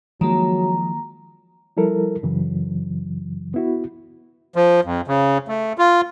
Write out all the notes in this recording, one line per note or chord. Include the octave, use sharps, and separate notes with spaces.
D#3 F3 F#3 G#3 A#3 A#5
F3 G3 E4 A4 A#4
F#2 C#3 E3 F#3
B3 E4 F#4
F3
F2
C#3
A3
F4